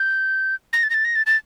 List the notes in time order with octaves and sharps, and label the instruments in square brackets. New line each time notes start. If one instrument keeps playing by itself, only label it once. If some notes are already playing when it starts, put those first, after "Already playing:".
Already playing: [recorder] G6
A#6
A6
A#6
A6
A#6
A6
A6